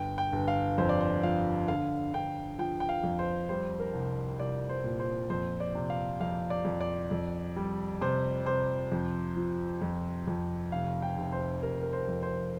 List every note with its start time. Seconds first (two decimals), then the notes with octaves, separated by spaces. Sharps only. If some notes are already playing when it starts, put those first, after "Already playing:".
Already playing: G1 G5
0.18 G5
0.32 G1
0.48 F5
0.78 F2 C5
0.89 D5
1.01 C5
1.23 F3 F5
1.68 D3 F5
2.14 D3 G5
2.58 F3 G5
2.80 G5
2.89 F5
3.04 F2
3.19 C5
3.49 G3 C5
3.80 A#4
3.94 C2
4.39 C2 D5
4.69 C5
4.84 A#2
5.00 C5
5.30 F2 C5
5.60 D5
5.75 C3
5.90 F5
6.20 F2 F5
6.50 D5
6.65 F2
6.81 D5
7.11 F2
7.56 G3
8.01 C3 C5
8.46 C3 C5
8.92 F2
9.36 F3
9.82 F2
10.27 F2
10.72 F1 F5
11.02 G5
11.18 F1
11.32 C5
11.63 F1 A#4
11.82 A#4
11.93 C5
12.08 F2
12.23 C5